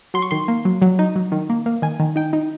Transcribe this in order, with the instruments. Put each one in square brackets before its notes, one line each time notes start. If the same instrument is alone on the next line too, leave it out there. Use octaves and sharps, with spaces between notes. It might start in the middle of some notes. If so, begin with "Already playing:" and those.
[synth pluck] F#3 C6
C#6
D#3 C6
A#3
F#3
F#3
D#4
F#3
D#3
A#3
A#3
D#3 G#5
D#3
D#4 G5
D#4